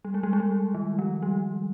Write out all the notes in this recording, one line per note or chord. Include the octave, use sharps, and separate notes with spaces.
G3
G#3
G3
G#3
G3
D#3
F3
G3